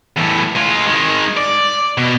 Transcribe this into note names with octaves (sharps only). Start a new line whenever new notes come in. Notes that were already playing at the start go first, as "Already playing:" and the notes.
E2 A2
G#3 F4
D#3 G#3
D5
B2